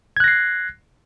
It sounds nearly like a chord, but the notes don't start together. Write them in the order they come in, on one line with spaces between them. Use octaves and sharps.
G#6 F#6 A#6 C7